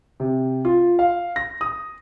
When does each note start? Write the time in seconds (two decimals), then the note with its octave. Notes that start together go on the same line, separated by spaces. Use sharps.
0.20 C3
0.65 F4
0.99 F5
1.36 A#6
1.61 D#6